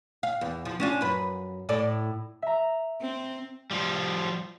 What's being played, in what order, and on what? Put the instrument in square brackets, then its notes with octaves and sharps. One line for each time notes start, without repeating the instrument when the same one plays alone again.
[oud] F5
E2
F3
C#4 D4 F4
F#2 B4
A2 A4 D5
[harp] E5 A#5
[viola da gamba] C4
[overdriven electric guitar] F3 G3